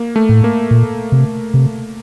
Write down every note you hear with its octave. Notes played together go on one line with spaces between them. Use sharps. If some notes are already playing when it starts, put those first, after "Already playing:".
Already playing: A#3
A3
A2
A#3
A#2
C3
C3